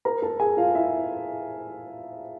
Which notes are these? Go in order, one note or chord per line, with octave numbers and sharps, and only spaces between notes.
A#4 A#5
A4 A5
G#4 G#5
F4 F5
E4 E5